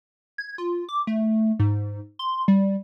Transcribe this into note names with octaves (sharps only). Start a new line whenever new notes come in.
G#6
F4
D6
A3
G#2
C6
G3